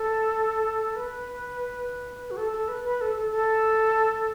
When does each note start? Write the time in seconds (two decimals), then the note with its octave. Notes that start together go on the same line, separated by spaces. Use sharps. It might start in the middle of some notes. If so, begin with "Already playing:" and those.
Already playing: A4
0.96 B4
2.31 F#4
2.37 A4
2.53 A4
2.68 B4
2.84 B4
3.01 A4
3.16 A4
3.31 A4